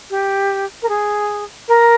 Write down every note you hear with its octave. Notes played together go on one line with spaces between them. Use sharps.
G4
A#4
G#4
A#4